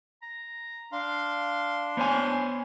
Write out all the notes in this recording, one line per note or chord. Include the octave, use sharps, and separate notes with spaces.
A#5
D4 F5 C6
B3 C5 C#5 G#5